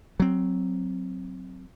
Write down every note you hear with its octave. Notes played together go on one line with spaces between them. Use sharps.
F#3 C4